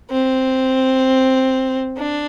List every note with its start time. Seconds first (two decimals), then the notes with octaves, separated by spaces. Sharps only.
0.11 C4
1.98 D4